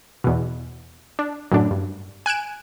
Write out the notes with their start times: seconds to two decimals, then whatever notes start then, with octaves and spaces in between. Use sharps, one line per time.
0.24 E2 B2
1.19 D4
1.52 F#2 A2 D4
1.71 G2
2.26 G#5 F#6 D7 E7